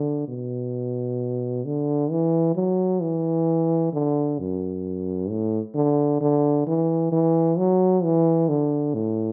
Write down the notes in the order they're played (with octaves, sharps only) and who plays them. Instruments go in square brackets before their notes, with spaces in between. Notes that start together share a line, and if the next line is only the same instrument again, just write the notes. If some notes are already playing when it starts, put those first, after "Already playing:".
Already playing: [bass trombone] D3
B2
D3
E3
F#3
E3
D3
F#2
A2
D3
D3
E3
E3
F#3
E3
D3
A2